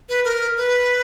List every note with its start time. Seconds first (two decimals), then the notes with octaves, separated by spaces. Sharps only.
0.09 B4
0.25 A#4
0.57 B4